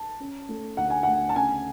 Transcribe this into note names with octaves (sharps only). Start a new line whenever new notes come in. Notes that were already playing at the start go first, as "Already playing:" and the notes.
Already playing: A5
C#4
A3
D2 F#5
G#5
D2 F#5
A5
C#3 G#5